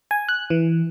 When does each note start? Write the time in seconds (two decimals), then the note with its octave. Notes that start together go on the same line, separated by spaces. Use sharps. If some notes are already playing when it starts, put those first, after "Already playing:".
0.11 G#5
0.29 F#6
0.50 E3